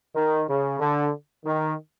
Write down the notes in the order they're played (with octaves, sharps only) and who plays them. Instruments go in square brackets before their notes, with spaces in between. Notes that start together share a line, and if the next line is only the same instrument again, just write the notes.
[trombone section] D#3
C#3
D3
D#3